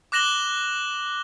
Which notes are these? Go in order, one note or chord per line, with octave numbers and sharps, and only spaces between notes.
D6 F#6 A#6 E7 F#7 G7